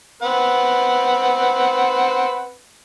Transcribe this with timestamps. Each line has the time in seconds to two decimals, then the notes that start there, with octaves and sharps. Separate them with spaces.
0.22 C4 B4 F#5